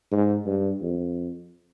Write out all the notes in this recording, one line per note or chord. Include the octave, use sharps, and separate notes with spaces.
G#2
G2
F2